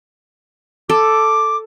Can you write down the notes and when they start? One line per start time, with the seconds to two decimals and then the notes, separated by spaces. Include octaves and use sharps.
0.90 A4 D6